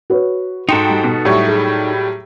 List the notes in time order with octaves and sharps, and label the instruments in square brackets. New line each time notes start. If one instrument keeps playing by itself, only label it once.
[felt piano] F#4 B4 C#5
[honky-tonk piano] G#2 G5 [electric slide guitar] D#4 F#4 A4 [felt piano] C6
[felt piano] G3
[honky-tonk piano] B2
[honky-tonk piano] A2 F#3 G3 [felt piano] E5 C#6
[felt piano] G#4